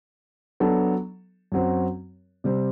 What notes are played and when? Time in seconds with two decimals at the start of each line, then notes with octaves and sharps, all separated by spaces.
0.60 F#3 B3 D4 A4
1.52 F#2 F#3 C4 F#4
2.44 C3 G3 C4